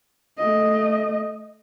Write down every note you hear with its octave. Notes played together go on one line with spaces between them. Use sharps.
A3 D#5